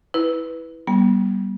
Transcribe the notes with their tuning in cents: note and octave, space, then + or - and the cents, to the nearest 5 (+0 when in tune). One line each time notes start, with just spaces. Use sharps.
E4 -10 B4 +0
G3 -15 B3 -40